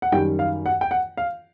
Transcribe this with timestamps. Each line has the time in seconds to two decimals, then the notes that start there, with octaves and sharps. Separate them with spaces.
0.02 F#5
0.12 F#2 D#3 G3 G5
0.39 F5
0.66 F#5
0.81 G5
0.91 F#5
1.17 F5